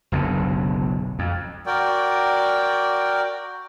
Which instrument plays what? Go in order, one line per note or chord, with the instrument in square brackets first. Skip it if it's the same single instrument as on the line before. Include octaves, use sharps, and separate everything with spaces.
[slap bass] F#1 B1 F#2 D3
F2
[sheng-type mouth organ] F#4 A#4 D5 G5